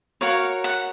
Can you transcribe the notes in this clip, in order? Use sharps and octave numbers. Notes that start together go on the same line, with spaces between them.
F#4 A#4 C#5 F5
F#5